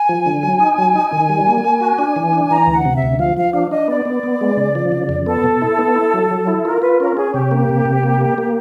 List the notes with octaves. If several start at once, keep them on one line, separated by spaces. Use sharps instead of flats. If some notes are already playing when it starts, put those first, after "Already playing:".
Already playing: G#5
F3
D3
F#3
D#4
F#3
D#4
D#3
G3
A#3
A#3
F#4
D4
E3
D4
E3 A#5
D2
F#5
C3
E5
D2
F3 F5
F3 F5
D4 F5
D4 D#5
B3 D5
B3
B3
G#3
C#3
F3
C#3
F2
B3 A4
B2
E4
B3
E4
F#3
F#3
E4
F4 A#4
F4 B4
C#4 A#4
C#4 G#4
C3 G4
A#3
C3
C3
A#3
A#3
A#3